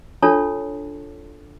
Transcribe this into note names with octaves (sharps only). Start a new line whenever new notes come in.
D4 F4 A4 C#5 A5